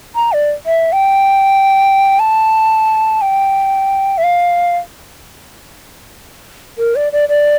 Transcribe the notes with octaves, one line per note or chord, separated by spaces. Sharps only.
A#5
D5
E5
G5
A5
G5
E5
F5
A#4
D5
D5
D5